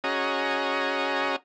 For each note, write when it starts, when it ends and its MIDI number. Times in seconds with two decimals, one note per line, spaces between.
0.04 1.36 61
0.04 1.36 66
0.04 1.36 68
0.04 1.36 75
0.04 1.36 82